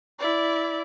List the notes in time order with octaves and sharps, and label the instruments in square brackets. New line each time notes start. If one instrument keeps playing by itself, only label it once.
[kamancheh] E4 D5